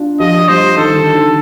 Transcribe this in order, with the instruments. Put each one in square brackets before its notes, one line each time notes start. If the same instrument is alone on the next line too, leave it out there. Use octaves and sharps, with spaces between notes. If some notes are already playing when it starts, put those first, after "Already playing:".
Already playing: [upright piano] D4 F4
[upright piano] F3 [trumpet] D#5
[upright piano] G3 [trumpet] C5
[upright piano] D#3 [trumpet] A4
[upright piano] D3
D#3